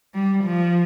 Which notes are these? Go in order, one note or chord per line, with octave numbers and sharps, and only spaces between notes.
G3
F3